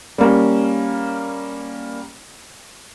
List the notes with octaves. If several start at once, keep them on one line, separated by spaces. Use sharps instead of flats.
G3 A#3 C#4